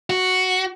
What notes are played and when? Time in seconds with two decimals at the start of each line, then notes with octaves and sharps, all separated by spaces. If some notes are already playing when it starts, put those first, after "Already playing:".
0.10 F#4